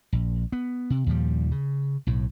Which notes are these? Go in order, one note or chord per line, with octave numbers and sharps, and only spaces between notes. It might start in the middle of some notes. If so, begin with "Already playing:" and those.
A#1
B3
C3
D#2 A#2 F3 G3
C#3
B1 A2